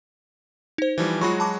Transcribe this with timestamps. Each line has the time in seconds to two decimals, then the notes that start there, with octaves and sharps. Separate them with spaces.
0.78 D#4 C5
0.98 E3 F3 G3
1.21 F#3 G#3 F4 F#4 B5 C#6
1.40 A5 B5 D6